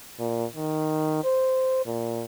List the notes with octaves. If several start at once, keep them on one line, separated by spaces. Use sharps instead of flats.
A#2
D#3
C5
A#2